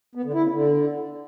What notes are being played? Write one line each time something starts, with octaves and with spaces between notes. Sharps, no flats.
B3
D3
E4
C#3
D3